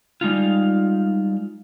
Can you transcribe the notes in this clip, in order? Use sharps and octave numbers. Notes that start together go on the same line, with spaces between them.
G3 G#3 D#4 F4